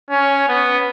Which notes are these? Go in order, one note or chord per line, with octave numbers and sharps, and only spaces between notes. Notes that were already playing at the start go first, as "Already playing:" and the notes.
C#4
B3